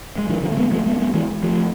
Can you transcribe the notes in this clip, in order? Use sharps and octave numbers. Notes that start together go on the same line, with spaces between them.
G#3
D3 F3
D3 F3
A3
G#3 B3
F3 A3
G#3 B3
G#3 B3
E3 G#3
F3 A3